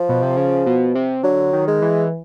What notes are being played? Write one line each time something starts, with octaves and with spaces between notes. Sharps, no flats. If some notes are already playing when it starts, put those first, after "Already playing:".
Already playing: F3
B2
C3
C#3
B2
C3
D3 F#3
D#3
G#3
E3